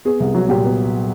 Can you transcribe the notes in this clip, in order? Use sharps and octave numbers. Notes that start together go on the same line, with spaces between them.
B3 G#4
C2
F#3
A#2 G4
B3